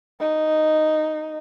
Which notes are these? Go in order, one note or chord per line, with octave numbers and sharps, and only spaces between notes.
D#4